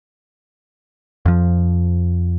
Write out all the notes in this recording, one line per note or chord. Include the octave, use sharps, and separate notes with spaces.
F2 F3